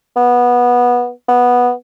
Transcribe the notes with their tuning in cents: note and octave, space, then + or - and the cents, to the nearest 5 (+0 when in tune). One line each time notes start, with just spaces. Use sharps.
B3 -15
B3 -10